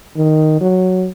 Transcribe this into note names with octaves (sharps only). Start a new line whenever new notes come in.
D#3
F#3